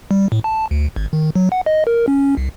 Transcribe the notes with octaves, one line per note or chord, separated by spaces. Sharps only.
G3
A2
A5
D2
G#1
D#3
F#3
F#5
D#5
A#4
C#4
C2